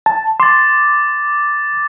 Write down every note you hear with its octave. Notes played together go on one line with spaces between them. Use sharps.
A5
C6 D6 A6